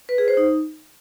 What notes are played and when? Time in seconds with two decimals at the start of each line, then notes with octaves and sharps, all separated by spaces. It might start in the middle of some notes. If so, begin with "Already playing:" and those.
0.09 B4
0.18 G#4
0.28 C5
0.37 D#4